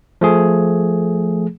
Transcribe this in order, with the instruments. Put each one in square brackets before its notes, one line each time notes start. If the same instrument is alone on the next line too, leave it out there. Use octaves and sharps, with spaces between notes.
[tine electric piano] F3 A3 G#4